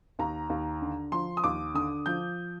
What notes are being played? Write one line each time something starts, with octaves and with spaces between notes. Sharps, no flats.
D#2 A#5
D#2
D3
F3 C6
D#6
D#2 D6
D3 D#6
F3 G6